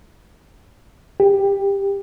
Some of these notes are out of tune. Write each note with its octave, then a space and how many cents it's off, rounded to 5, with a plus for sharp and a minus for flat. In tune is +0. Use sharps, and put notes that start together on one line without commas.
G4 +15